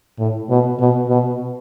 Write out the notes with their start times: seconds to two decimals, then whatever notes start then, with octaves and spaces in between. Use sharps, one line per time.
0.19 A2
0.49 B2
0.80 B2
1.09 B2